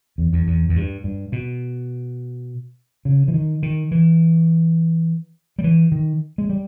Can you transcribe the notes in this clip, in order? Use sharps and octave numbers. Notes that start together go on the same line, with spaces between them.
E2
E2
E2
E2
G2
G2
B2
C#3
E3
D#3
D#3
E3
G3
E3
D#3
G#3
G3